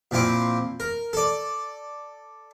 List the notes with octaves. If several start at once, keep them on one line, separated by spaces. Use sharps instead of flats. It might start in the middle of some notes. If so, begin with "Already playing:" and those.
A#2 F3 C4 E4 D6
A#4
A4 D5